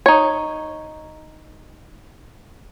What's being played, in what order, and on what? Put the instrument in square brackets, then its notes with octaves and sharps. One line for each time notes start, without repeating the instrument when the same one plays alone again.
[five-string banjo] D#4 C#5